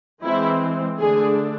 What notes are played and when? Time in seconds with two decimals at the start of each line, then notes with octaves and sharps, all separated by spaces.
0.23 E3 G#3 C4 E4
0.99 D3 A3 D4 G#4